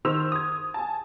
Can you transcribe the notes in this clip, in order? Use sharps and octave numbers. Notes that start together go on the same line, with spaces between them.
D#3 C5 E6 F7
D#6 G#6
G#5 A5